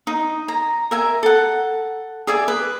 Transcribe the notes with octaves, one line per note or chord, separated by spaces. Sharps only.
D#4
A#5
A#4 E5 G#5
A4 F#5
G#4 D5 E5 G#5
B4